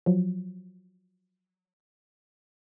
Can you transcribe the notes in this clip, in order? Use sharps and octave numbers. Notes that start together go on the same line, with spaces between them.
F3 F#3